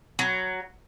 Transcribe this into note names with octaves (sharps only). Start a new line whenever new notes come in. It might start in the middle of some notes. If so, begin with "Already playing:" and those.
F#3